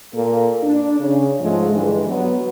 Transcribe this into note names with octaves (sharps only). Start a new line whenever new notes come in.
A#2 A#3 A4
D4
C#3
G#2 F3 G#3 A3
G2 D3 E3 G#3
F#3 B3